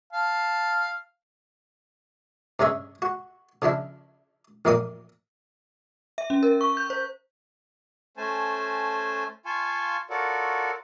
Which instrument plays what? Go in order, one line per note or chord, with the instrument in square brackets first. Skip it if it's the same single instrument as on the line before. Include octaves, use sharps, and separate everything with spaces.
[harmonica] F5 A5
[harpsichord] G2 C3 C#4 G#4 E5
F#4
C#3 F3 D4 E4
A1 F2 A#2 A#3 F5 D#6
[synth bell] E5
C#4
A#4
C#6
G6
C5
[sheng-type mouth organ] A3 C#4 C5 G#5 A5
F4 F5 G#5 A5 C6 C#6
F4 F#4 A4 A#4 C#5 D5